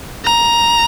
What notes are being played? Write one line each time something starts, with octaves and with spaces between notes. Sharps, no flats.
A#5